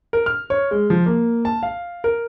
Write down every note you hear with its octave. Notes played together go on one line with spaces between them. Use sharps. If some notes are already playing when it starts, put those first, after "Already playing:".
A#4
F6
C#5
G#3
F3
A#3
A5
F5
A#4